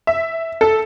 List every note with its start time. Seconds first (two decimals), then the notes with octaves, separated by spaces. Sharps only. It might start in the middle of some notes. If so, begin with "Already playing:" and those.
0.07 E5
0.61 A4